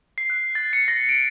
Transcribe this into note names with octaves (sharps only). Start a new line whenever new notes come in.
C7
F#6
A6
C#7
A#6
D7